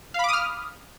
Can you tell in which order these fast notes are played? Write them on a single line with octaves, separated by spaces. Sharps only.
F5 B5 D6 D#6 F6